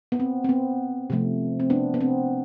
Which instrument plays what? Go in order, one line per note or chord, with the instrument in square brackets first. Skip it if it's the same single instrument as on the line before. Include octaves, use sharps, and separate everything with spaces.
[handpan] B3
C4
C4
B3
C3 F3 A3
C4
B3 D4
B3
C4